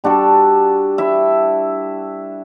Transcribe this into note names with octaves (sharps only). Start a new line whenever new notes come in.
G3 D4 F#4 A4
E4 E5